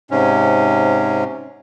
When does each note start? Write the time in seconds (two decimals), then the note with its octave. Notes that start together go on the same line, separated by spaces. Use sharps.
0.11 G#2 C3 C#4